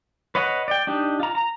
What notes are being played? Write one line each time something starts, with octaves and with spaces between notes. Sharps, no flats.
B4 C#5 D#5 F#5
D5 G5
D4 D#4 G4
F4 A#5
A#5